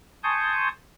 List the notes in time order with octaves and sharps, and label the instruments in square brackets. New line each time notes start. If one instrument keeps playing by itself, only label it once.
[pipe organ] G#5 A5 C6 C#6 D#6 G6